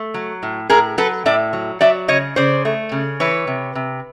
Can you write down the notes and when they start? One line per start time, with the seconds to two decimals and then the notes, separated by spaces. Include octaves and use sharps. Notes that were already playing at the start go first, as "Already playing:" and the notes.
Already playing: A3
0.14 F#3
0.43 A2
0.69 A2 G#4 A#4
0.98 F#3 A4 B4
1.26 A2 D5 E5
1.53 F#3
1.81 F#3 D5 E5
2.08 C#3 C#5 D#5
2.36 C#3 C5 D5
2.65 A3
2.92 C#3
3.20 E3 B4 C#5
3.47 C3
3.75 C3